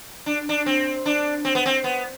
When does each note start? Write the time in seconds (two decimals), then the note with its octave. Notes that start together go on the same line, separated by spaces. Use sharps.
0.26 D4
0.49 D4
0.66 C4
1.06 D4
1.45 C4
1.55 B3
1.66 C4
1.84 B3